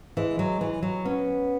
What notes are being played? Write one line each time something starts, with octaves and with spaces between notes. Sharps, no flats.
E3 G#3
F#3
E3
F#3
B3 C#4